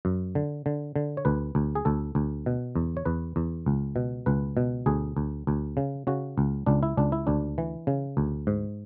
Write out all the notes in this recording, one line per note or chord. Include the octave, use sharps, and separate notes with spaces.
F#2
D3
D3
D3
C#5
D2 B4
D2
G#4
D2 A4
D2
B2
E2
C#5
E2 B4
E2
C#2
B2
C#2 B4
B2
D2 G#4
D2
D2
C#3
C#3 F#4
C#2
C#2 D4
E4
C#2 D4
E4
D2 D4
E3
C#3
D2
G#2